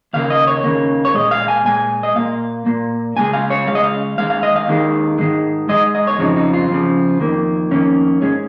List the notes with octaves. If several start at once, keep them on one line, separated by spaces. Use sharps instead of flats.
D#2 C#3 A#3 F5
D#5
C#5
D#2 C#3 A#3
C#5
A#2 G#3 D#5
F5
G#5
A#2 G#3 G#5
D#5
A#2 A#3 F5
A#2 A#3
C#2 C#3 G#3 G#5
F5
C#5
C#2 C#3 G#3 F5
D#5
F5
D#2 D#3 G#3 F5
F5
D#5
F5
D#2 D#3 G#3
G#2 D#3 G#3
G#2 D#3 G#3 D#5
D#5
C#5
F2 C#3 F3 D#4
D#4
F4
F2 C#3 F3
F2 D#3 A#3
F2 D#3 A#3 C#4
G#2 G#3 C#4